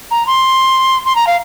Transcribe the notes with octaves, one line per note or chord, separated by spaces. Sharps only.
A#5
C6
C6
A#5
F5